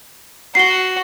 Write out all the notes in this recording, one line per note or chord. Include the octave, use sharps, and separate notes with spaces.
F#4 C7 G7